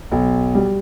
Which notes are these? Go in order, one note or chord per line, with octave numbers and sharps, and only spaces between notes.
B1
G3